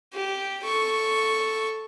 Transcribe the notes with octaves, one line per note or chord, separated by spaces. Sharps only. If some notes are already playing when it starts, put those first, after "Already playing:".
G4
A4 C#6